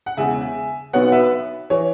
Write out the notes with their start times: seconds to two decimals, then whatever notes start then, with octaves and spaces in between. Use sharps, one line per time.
0.06 F#5
0.17 E1 E2 C#3 G#3 E5 G#5
0.93 B1 B2 B3 C#5 F#5
1.12 B4 E5
1.70 E3 C#5